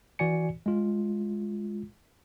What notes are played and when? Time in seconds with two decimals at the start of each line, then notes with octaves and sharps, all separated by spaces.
0.19 E3 F#4 D5 G#5 C#7
0.66 G#3 F4